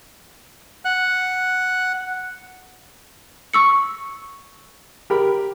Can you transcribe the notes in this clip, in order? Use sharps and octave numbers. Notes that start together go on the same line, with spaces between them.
F#5 F#6
C#6 E6 C#7
G4 A#4 B5